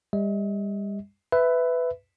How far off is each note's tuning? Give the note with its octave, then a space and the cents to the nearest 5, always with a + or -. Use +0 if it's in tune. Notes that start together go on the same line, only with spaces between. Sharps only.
G3 +35 D#5 +45
B4 +15 E5 +0